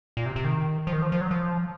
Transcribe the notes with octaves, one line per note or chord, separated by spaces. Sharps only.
A#2
C3
C3
D#3
F3
D#3
F3
F3
F#3
F3